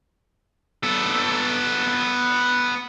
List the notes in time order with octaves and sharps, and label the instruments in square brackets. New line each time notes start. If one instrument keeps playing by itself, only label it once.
[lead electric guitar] B3 A4